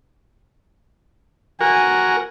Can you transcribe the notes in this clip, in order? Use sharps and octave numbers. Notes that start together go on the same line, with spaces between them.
F#4 A#4 G#5